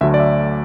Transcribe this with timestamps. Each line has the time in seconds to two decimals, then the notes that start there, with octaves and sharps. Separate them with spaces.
0.01 D2 D3 F#3 A3 E5
0.14 D5
0.20 E5